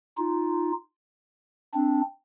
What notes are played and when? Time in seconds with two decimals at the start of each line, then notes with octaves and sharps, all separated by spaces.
0.17 D#4 F4
1.73 C4 D4